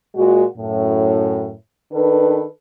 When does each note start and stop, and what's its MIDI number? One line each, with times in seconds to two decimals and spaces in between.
0.16 0.44 46
0.16 0.44 56
0.16 0.44 66
0.57 1.53 42
0.57 1.53 45
1.93 2.45 51
1.93 2.45 62
1.93 2.45 69
1.93 2.45 71